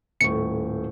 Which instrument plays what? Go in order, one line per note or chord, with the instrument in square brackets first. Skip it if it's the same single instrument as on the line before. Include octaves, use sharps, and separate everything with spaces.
[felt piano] D#1 A2 C#6 [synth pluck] C#7